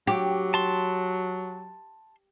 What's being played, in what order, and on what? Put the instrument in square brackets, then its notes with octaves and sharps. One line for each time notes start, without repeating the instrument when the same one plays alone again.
[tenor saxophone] F#3 [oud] G4
[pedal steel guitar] A5 C6